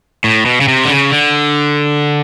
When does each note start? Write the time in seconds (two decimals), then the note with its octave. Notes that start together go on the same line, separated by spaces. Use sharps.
0.24 A2
0.46 B2
0.61 C#3
0.68 C3
0.85 D3
0.90 C#3
1.12 D3